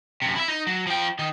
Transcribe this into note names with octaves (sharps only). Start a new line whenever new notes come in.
F#2 C3
E4 E5
D#4
F#3
F3 G5
D#3 D#4